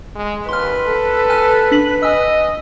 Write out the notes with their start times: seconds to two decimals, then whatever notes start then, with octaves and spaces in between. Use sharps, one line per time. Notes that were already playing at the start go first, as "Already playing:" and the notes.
0.16 G#3
0.49 D#2 B4 C6 F6
0.87 A4
1.30 G#5 F6 F#6
1.71 D4 B6 F#7
2.03 D#5 G#5 E6